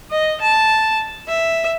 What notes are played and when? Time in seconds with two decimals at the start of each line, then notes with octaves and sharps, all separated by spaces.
0.11 D#5
0.41 A5
1.28 E5